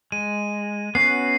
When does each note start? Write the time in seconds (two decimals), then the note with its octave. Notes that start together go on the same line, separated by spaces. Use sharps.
0.12 G#3 D#7
0.95 B3 C#4 F#4 C7